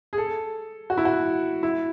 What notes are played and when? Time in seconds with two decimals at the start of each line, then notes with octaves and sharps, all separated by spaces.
0.13 G#4
0.18 A4
0.90 F#4
0.97 E4
1.05 F#4
1.63 E4